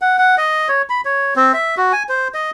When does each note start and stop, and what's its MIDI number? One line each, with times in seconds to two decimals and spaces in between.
0.02 0.16 78
0.18 0.35 78
0.38 0.68 75
0.69 0.82 73
0.90 1.01 83
1.05 1.34 73
1.36 1.52 60
1.54 1.75 76
1.77 1.92 66
1.92 2.03 80
2.09 2.28 72
2.34 2.51 75